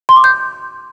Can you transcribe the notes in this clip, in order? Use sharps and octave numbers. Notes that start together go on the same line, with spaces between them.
C6
D6
G6